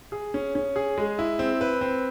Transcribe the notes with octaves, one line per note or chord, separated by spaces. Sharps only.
G#4
C#4
C#4
G#4
G#3
E4
C4
B4
C4